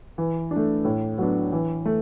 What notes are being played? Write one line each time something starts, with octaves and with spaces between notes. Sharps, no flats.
E3
D4
A3
A2
F#3 B3 D4
E3
A3